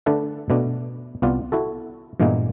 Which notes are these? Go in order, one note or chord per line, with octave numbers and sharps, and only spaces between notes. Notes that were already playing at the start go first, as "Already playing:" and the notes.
D3 A3 D4 A4 B4 E5
B2 A3 B3 D4
C2 B3 F4 D5
E4 F#4 A4
G2 A#2 E3 G#3 A#3 B3